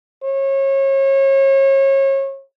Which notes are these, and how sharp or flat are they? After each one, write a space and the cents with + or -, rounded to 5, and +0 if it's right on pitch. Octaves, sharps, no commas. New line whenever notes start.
C#5 -30